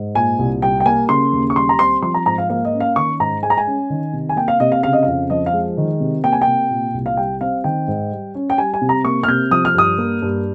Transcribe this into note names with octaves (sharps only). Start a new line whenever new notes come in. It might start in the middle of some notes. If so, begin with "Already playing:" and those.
Already playing: G#2
A#2 G#5
C2
G3 G5
G5
A#3 G#5
C#3 C6
D#2
C#6
G3 C6
A#5
C4 C6
F3 C6
A#5
G#2 A#5
F5
A#3 F5
D#5
C#4
F5
D#3 C#6
G#2 A#5
G#3 G#5
A#5
G#5
C#4
D#3
C3
G#5
A#3 G5
F5
C3 D#5
F5
C#3 F5
D#5
F2 F5
F3 D#5
F5
G#3
D#3
C3
A#3 G5
G#5
G5
C3
A#2
C2
F5
G3 G5
C4 F5
D#3 G5
G#2
G3
C#4
G5
G3 G#5
G#5
C3
A#5
A#3 C#6
F6
C3 G6
F3 D#6
F6
G2 D#6
A#3
G2